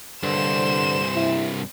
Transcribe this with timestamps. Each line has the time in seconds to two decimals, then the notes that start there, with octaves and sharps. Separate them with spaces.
0.23 C2 G2 D3 C5 E7
1.15 E4